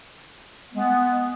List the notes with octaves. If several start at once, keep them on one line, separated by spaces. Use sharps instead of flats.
G#3 B3